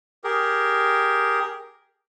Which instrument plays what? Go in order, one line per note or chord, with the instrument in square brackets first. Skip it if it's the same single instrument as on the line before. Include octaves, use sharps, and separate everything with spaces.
[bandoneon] G4 G#4 A#4